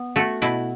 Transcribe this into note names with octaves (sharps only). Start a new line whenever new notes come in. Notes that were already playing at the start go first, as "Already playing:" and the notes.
Already playing: B3
A3 F#4
B2 E4